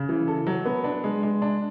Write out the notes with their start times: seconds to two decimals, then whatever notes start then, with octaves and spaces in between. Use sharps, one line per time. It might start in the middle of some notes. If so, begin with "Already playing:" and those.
Already playing: C#3
0.09 E3
0.28 A4
0.47 F#3
0.65 B3
0.84 D4
1.04 G#3
1.23 G#3
1.42 D4